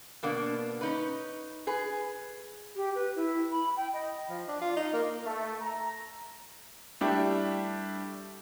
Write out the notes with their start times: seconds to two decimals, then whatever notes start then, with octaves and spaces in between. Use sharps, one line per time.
0.23 B2 A#3 B3 D4
0.81 C#4 D#4 B4
1.67 G#4 B4
2.76 G4
2.95 B4
3.16 E4
3.51 B5
3.77 G5
3.94 D#5
4.30 F3
4.48 D4
4.61 F4
4.76 D#4
4.93 A#3
5.25 A3
5.62 A#5
7.01 G3 A3 D4 E4 G4